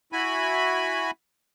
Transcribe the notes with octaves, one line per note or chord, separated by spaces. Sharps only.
E4 F#4 G#5 B5